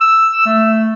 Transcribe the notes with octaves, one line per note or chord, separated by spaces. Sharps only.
E6
A3